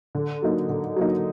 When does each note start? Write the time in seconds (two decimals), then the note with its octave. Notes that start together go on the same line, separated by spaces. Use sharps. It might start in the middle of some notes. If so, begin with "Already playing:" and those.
0.15 D3
0.42 F#3 A#3 D#4
0.69 D3
0.96 F#3 A#3 D#4